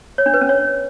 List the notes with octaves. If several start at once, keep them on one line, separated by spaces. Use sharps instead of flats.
C#5
D4
B4
C#4
C#5